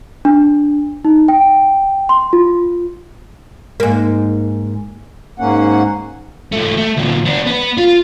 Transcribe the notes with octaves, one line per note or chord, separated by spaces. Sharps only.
D4
D#4
G5
C6
F4
G#2 A#3
G#2 A#3 C#4 F#5
B1 A3
A3
D2 A#2
B3 D4
B3 B4
F4